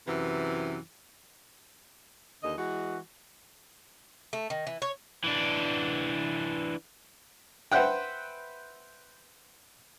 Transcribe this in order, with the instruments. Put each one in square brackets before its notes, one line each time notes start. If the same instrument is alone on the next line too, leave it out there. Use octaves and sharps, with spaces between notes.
[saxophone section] F#2 C3 E3
D#2 D3 D#5
E3 G#3 F#4
[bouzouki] A3
D#3
E3
C#5
[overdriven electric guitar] E3 D4
[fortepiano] B4 C5 E5 F#5 G5